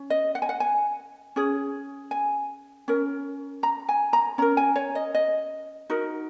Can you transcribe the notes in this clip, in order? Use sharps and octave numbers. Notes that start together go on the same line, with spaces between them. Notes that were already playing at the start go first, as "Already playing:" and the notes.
Already playing: C#4
D#5
F#5
G#5
F#5
G#5
C#4 G#4
G#5
C#4 A#4
A#5
G#5
A#5
C#4 A#4 A#5
G#5
C#5
D#5
D#5
D#4 F#4 A#4